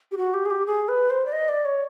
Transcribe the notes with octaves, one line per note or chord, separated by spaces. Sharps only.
G4
F#4
G4
G#4
G4
G#4
B4
C5
D5
D#5
D5
C#5